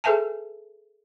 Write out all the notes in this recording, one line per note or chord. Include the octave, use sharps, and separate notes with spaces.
G#4 A4 B4 E5 G#5 A5